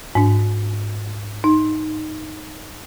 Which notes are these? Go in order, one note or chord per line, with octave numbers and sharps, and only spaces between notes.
G#2 D4
D#4